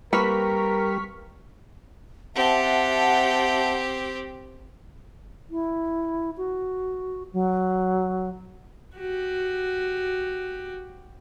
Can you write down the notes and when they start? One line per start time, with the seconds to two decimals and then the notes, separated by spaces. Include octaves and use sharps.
0.13 G3 A#3 C4 A#4 B4 C#6 F6 B6
2.35 C4 G4 E5 F#5 A5
5.50 E4
6.37 F#4
7.33 F#3
8.96 F#4 G4